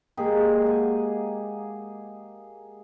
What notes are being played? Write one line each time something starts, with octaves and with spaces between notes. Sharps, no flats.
G#3 A#3 G4 G#4
F#5 G#5